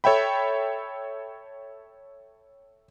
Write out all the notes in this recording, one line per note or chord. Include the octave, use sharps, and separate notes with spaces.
A4 C#5 E5 G5 B5